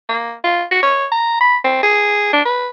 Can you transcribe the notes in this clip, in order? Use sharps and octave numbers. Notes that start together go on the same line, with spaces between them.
A#3
F4
F#4
C#5
A#5
B5
C4
G#4
D4
B4